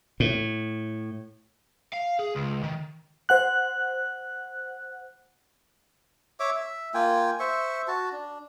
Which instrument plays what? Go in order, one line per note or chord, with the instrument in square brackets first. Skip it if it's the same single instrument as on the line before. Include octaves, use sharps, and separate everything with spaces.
[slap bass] A2
[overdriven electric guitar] F5
G#4
C#2
D#3
[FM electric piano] C5 F#5 F#6
[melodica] C#5 E5 D6
E5
A#3 F4 G5 G#5
C5 E5 C#6
F#4 A5
D4